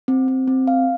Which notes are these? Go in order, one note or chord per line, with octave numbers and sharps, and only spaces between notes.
C4
C4
C4
F5